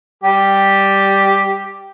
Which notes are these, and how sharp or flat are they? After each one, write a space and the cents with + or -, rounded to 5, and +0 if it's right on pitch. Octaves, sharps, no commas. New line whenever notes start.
G3 +0 G4 +0